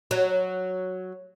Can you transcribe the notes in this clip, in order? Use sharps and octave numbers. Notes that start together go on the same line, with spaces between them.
F#3